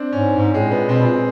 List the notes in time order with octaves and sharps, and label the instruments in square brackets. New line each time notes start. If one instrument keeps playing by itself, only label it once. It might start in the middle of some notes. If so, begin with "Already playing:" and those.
Already playing: [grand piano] C4 D4
[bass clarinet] G#2 [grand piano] C#4
[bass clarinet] G#2 [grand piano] C#4
[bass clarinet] A2 [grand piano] G#3
[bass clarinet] A#2 [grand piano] B3
[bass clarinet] B2 [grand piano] C4
[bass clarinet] B2
A#2